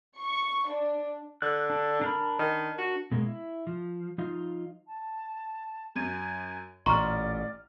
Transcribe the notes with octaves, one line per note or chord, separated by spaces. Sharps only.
C#6
D4
D3 F#6
D4
D4 A#4 B5
D#3
F#4
B2 G#3 A#3
E4
F3
F3 D#4 F4 D#5 F5
A5
F#2 G#5 G#6 D#7
A1 A#2 D5 D#5 A#5 C6 C#6 F6